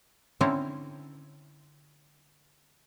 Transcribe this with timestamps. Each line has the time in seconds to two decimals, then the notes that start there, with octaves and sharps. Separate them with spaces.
0.41 D3 C4 C#4 E4 A4 A#5